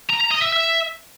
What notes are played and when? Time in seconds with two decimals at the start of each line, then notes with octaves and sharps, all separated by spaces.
0.10 A#5
0.20 A#5
0.31 D#5
0.42 E5
0.52 E5